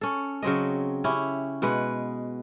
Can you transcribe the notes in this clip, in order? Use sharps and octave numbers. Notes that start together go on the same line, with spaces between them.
C#4 A4
C#3 F#3 C4 D#5
C#4 E4 G4
B2 G#3 B4 F#5